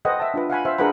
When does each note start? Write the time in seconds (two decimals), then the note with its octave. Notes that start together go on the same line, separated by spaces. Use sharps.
0.05 A4 B4 C5 D#5 F#5 G5
0.20 E5 A5
0.34 D4 F4 B4
0.50 F5 F#5 G#5 B5
0.65 C5 E5 F5
0.78 D4 G#4 A#4 B4 F#5 B5